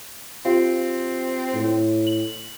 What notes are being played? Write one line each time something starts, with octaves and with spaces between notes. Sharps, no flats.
C4 F4 G4 F5
A2
F#7